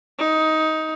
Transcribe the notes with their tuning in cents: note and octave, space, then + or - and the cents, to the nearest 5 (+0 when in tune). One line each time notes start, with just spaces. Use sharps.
D#4 +15